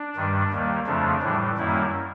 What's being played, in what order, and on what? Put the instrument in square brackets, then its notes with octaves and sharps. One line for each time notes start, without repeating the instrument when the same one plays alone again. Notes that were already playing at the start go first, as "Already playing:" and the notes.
Already playing: [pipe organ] D4
G2 D#3 G3
D#2 D#3 G3 A#3
F2 C#3 F3 A3 D4
A2 E3 G3
F#2 D#3 G3 A#3 E4